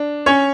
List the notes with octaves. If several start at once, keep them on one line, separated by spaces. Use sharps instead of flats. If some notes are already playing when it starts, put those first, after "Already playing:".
Already playing: D4
C#4 C#5